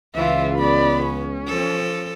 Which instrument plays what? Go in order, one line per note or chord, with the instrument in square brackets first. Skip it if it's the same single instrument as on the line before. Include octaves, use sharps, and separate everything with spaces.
[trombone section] C#2 [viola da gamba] E3 [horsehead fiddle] F4 E5
[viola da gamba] B3 [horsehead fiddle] D5 B5
[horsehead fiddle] C#4
[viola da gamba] F3 A4